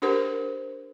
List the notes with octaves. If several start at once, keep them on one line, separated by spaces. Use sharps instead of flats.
D4 G4 A#4 C5